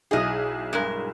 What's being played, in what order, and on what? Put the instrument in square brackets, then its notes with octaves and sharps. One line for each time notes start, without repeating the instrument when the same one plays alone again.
[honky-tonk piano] B1 E4 G#4 [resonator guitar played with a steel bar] D#4 D#5
[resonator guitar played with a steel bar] G2 G#3 A#4